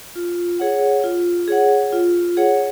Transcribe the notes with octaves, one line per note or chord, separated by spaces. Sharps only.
F4
G#4 C#5 F#5
F4
G#4 C#5 F#5
F4
G#4 C#5 F#5